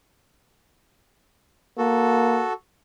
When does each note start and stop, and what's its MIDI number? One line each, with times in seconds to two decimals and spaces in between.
1.78 2.43 58
1.78 2.53 66
1.78 2.53 69